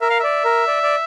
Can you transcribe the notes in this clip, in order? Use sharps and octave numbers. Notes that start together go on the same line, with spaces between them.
A#4 E5
F5
D5 E5
A#4
D5
D5